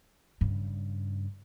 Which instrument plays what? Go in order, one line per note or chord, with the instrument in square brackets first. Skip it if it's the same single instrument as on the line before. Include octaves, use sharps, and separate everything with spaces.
[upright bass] G2 C#3